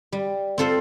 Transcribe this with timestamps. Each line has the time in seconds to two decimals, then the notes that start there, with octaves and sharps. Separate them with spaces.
0.12 G3
0.58 C4 F4 A4 C5